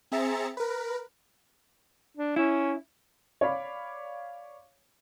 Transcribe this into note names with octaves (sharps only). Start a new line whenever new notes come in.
C4 G#4 E5 A#5 A6 C#7
A#4 B4
D4
C#4 E4
C#5 D5 F5 B5 D6